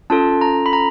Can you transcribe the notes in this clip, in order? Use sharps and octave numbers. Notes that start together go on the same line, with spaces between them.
C#4 F4 A4 A5
A#5
B5
A#5